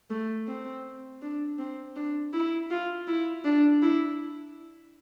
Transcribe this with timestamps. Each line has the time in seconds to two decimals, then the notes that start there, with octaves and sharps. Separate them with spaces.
0.10 A3
0.48 C4
1.22 D4
1.59 C4
1.96 D4
2.33 E4
2.71 F4
3.08 E4
3.45 D4
3.82 E4